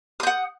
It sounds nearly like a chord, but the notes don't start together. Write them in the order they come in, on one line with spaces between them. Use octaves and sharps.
D#6 G6 F#5